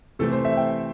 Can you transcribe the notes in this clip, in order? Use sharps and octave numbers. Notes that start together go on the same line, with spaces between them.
C3 E3 A3 C4 A4
C5
E5
G5